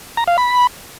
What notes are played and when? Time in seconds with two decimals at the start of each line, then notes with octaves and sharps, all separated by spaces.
0.17 A#5
0.27 F5
0.38 B5